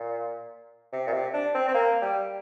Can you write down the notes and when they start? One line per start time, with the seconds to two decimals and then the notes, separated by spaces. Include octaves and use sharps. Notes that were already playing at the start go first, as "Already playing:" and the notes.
Already playing: A#2
0.93 C3
1.07 A#2
1.13 C3
1.34 D4
1.54 C4
1.68 C4
1.74 A#3
2.02 G3